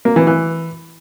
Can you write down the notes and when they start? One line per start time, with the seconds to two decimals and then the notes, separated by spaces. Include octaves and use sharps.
0.05 A#3
0.16 E3
0.27 E3